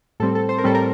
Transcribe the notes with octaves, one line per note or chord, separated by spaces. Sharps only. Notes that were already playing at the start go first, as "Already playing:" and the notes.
A2 G3 C4 A4
A4
C5
A#4
A2 G3 C4 A4
A#4